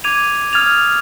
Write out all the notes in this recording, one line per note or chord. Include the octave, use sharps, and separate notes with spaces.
D6 G#6 D#7 F7
D#6 F6 G#6 A6 F7